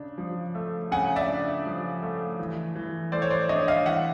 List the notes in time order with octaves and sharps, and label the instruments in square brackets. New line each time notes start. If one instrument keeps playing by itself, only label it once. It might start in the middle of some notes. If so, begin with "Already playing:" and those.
Already playing: [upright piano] C#3 D4
F3
A3
[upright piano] C#3 [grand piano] F#5 G#5
[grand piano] D5 E5
[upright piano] D4
F3
A3
E3
E3
[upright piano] A3 [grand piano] C5 D5
[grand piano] C#5
C5 D5
[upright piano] D4 [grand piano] C#5 D#5
[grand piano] D#5 F5
[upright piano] E3 [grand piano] E5 F#5